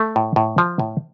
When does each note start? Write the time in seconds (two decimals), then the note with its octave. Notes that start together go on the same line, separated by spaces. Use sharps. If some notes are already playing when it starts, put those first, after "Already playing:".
Already playing: A3
0.16 A2
0.36 A2
0.58 F3
0.79 A2